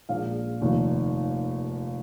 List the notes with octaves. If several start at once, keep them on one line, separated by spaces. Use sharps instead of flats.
A#1 A#2 G#3 F5
F1 D#2 D#3